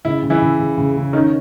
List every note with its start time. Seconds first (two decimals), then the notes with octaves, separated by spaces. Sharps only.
0.05 C#3 E4
0.22 C#3
0.30 E3 E4
0.42 C#3
0.59 C#3
0.78 C#3
0.96 C#3
1.13 D#3 C#4 D#4